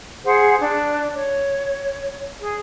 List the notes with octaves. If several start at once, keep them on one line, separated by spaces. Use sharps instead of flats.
G#4 C5 F#5
D4 F#6
C#5
G#4